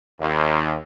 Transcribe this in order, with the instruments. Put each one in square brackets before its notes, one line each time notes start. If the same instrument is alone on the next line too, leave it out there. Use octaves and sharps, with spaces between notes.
[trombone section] D#2